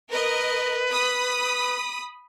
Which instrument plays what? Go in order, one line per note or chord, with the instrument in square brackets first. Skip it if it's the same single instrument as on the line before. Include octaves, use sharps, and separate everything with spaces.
[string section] A#4 D#5 [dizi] B4
[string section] B5 D#6